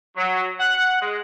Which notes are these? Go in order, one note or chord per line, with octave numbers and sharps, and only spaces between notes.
F#3
F#5
G#3